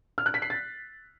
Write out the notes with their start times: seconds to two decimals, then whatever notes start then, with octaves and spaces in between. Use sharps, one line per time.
0.18 F6
0.26 F#6
0.34 B6
0.42 C7
0.50 A6